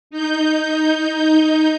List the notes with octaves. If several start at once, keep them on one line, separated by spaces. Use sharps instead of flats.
D#4 G6